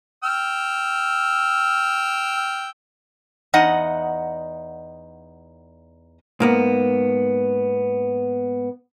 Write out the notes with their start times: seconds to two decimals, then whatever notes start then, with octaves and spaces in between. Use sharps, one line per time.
0.24 G5 E6 F6
3.54 E2 D#4 D#5 F#5
6.40 G#2 A#3 B3